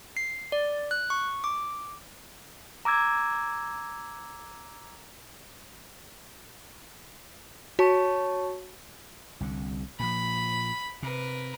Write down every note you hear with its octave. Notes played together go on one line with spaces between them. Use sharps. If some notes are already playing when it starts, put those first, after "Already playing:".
C7
D5
F#6
C#6
D6
A#5 D6 E6 G#6
F#4 C#5 A5 C#6
C2 D3
A#2 F3 B5
C3 A#4 B4